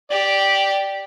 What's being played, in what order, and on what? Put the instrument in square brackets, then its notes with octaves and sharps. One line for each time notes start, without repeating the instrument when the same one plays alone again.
[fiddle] G4 [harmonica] D5